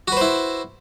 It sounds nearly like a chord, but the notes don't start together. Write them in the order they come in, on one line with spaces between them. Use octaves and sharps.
F#4 B4 C5 E4